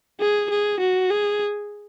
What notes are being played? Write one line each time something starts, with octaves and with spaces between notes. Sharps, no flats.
G#4
G#4
F#4
G#4